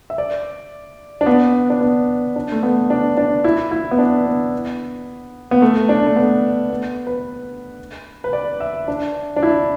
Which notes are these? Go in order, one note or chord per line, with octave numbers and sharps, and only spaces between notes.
E5
D5
D4
B3
D4
B3
D4
A3
B3
D4
D4
E4
E4
B3
D4
B3
B3
A3
D4
A3
B3
B3
B4
B4
D5
E5
D4
D4
E4